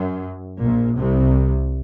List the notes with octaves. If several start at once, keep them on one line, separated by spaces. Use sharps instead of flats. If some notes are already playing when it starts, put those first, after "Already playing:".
Already playing: F#2
A#1 A#2
C2 C3